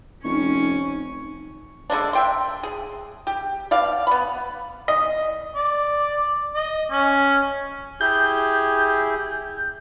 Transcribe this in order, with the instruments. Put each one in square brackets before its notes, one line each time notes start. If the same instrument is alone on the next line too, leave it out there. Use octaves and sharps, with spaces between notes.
[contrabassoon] F1 [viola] C#4 [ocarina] D#4 [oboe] C#6
[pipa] D3 G#3 A#3 D4
E5 G5 C6
G#4
G4
B2 D5 F5
B3 B5
[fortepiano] D#5
[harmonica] D5
D#5
C#4
[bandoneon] E4 G4 G#4 [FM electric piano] G6